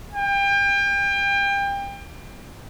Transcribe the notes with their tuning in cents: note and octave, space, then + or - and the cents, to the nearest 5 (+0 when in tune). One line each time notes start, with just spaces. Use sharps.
G5 +30